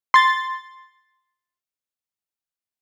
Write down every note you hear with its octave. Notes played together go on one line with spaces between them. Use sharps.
C6 A6